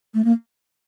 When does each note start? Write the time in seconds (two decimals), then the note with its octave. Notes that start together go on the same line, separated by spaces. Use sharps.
0.14 A3
0.25 A#3